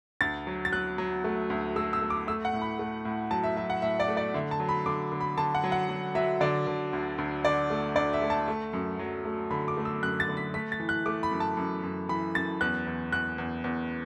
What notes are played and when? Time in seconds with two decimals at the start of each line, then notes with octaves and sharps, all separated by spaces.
0.21 D2 A6
0.47 F#3
0.65 A6
0.72 F#3 F#6
0.98 F#3
1.24 A3
1.50 D2
1.76 A3 E6
1.93 E6
2.02 A3
2.10 D6
2.27 A3 E6
2.45 F#5
2.53 A2
2.62 B5
2.79 A3
3.05 A2
3.31 F#3 A5
3.44 E5
3.57 F#3 E5
3.70 F#5
3.82 A2 E5
4.00 D5
4.08 A3
4.17 D5
4.34 D3 E5
4.51 A5
4.60 F#3
4.69 B5
4.86 D3 D6
5.12 D3
5.21 B5
5.38 D3 A5
5.55 F#5
5.64 F#3
5.72 F#5
5.89 F#3
6.15 F#3 E5
6.41 D3 D5
6.67 D3
6.93 D2
7.18 D2
7.44 D3 D5
7.70 A3
7.95 D2 D5
8.13 E5
8.22 A3
8.30 A5
8.48 A3
8.73 F#2
8.99 F#3
9.25 A3
9.51 D3 B5
9.68 D6
9.77 A3
9.85 E6
10.03 F#2 F#6
10.20 A6
10.28 D3
10.37 B6
10.54 A3 B6
10.72 A6
10.80 E3
10.89 F#6
11.06 A3 D6
11.23 B5
11.32 F#2
11.40 A5
11.57 F#2
11.83 F#2
12.09 E3 B5
12.35 F#2 A6
12.61 E2 F#6
12.87 E2
13.12 E2 F#6
13.38 E2
13.64 E2